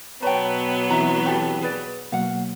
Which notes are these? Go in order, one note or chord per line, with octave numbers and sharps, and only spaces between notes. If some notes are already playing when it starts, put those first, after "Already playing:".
B2 F#3 B3 B4 C#5 G5 A5 A#5
E3 C4 D#4 E4 E5 A#5
F#4 G4 A4
G#4 B4 D5
B2 F#3 A#3 F5 F#5